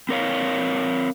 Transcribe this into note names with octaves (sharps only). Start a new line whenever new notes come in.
C4 A#4 C#5 F5